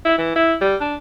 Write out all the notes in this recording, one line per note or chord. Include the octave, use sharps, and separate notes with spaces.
E4
E3
E4
G3
D4